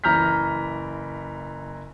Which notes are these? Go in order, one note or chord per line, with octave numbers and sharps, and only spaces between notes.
F#1 E3 A#5 F6 G6 B6